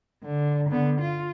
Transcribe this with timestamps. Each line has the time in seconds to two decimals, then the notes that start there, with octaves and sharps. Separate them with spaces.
0.24 D3
0.69 D3 B3
1.01 F4